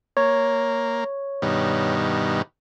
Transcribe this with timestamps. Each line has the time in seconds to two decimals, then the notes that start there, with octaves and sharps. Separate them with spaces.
0.17 A#3 C#5
1.42 G2 B2 D#3